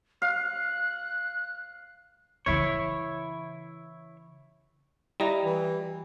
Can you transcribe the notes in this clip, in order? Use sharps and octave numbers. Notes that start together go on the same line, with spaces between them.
F5 F#6
C#3 E3 E4 C#5
G3 E4 D#5 A#5
E3